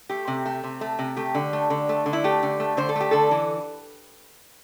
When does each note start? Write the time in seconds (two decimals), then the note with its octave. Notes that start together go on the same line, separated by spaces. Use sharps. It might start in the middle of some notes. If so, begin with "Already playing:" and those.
0.09 A3 G4
0.27 C3
0.46 A3
0.64 C3
0.81 A3
0.99 C3
1.17 A3 G4
1.35 D3
1.53 A3
1.70 D3
1.89 A3
2.06 D3
2.13 E4
2.24 A3 G4
2.43 D3
2.60 A3
2.77 D3 C5
2.89 A4
2.96 A3 G4
3.11 D3 A4
3.31 E3